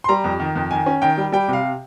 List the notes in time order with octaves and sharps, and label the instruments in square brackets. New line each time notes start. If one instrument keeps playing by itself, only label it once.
[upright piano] C6
G3 A#5
F2
D#3
F2
D#3 G#5
C#4
D#3 G5
G3
G3 G5
C3 F5